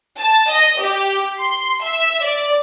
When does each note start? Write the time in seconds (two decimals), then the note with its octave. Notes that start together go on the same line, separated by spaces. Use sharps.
0.18 A5
0.49 D#5
0.81 G4
1.40 C6
1.84 E5
2.25 D5